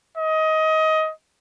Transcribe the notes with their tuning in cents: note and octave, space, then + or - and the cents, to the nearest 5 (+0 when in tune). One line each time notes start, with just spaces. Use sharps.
D#5 +20